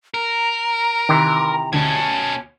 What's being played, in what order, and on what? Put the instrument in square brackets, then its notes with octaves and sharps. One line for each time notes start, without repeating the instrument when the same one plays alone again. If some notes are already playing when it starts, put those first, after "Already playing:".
[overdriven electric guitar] A#4 [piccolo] A#5
[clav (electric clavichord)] C3 E3 [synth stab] D#3
[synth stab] D2 G#6 [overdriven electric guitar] B2 C#4 [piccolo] A5